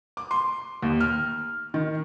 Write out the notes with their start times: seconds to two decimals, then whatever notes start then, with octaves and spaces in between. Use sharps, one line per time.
0.17 D6
0.31 C6
0.83 D#2
1.01 F6
1.74 D#3